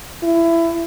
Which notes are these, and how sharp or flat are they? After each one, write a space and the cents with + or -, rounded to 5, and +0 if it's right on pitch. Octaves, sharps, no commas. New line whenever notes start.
E4 +20